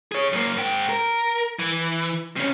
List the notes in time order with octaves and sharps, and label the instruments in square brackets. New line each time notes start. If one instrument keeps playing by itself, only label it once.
[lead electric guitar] G#4 C#5
F#2 A#3
G#2 G5
A#4
E3
C3 C#4